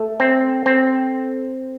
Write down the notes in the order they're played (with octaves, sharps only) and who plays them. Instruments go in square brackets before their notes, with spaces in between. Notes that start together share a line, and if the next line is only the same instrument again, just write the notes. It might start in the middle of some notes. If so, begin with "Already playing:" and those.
Already playing: [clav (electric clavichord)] A3 [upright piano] A4
[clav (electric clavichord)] C4
C4